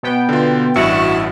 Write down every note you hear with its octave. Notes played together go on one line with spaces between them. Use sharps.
B2 B3 G5
D3 F4
A1 G2 E4 F#4 C#7